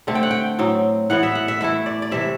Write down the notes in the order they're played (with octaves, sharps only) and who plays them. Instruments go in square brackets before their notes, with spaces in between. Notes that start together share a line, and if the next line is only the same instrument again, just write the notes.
[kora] D3 A3 C4
G5
F#5
G5
A2 F#3 C4
A2 E3 B3 F#5
E5
F#5
E5
E3 A3 E4 E5
D5
D5
C3 E3 A3 E5